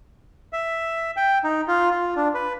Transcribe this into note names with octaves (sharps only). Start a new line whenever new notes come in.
E5
G5
D#4
F4
F4
D4
B4